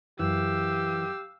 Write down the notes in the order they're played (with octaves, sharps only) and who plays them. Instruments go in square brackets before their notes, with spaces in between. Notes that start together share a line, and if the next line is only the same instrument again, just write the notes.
[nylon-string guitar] F#2 [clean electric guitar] E3 [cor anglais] G4 [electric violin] F5 E6